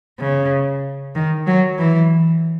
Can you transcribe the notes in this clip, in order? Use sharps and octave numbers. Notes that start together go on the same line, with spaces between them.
C#3
D#3
F#3
E3